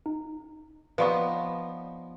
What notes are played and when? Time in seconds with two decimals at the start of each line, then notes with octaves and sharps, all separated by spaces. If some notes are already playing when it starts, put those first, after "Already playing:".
0.06 D#4
0.98 F3 B3 D#4 B4 D5 C#6